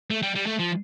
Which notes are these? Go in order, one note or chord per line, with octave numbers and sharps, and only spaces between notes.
A3
G3
G3
A3
F3